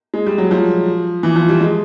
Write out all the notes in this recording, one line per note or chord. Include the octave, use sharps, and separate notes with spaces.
G#3
G3
F#3
F3
E3
F3
G3
G#3